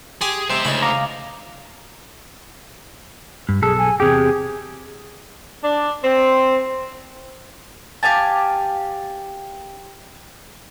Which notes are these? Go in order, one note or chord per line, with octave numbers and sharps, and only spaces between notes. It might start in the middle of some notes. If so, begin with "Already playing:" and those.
G4 G#4 G#5 C6
C3 G#3 C4 C5 E5
D2 C#3 D#4 E4 B5
F5 A#5 D6 D#6
G2
B1 G#4 A4
G#5
E2 C3 G4 G#4
D4
C4
G4 F5 G#5 A5